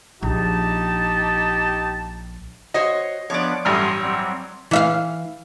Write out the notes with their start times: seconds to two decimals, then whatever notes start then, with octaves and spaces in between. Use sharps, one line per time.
0.23 A#1 D#4 G4 A5
2.74 F#4 C5 C#5 D#5
3.30 F3 B3 D4 C#5 D5
3.65 A1 G2 F#3 C6 D#6 F6
4.02 F#3 G3 C4
4.71 E3 E5 F5